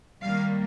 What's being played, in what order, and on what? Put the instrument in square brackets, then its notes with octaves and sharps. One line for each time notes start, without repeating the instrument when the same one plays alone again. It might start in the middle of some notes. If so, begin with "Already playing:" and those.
[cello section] D#3 G3 A#3 F5